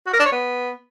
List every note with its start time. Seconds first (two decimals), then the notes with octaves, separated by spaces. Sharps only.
0.06 F#4
0.13 A#4
0.19 D4
0.26 C#5
0.32 B3